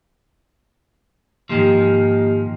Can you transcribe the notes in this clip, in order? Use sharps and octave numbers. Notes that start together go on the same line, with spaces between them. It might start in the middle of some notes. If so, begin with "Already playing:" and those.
G#2 D#3 F3 A#3 G4 D#5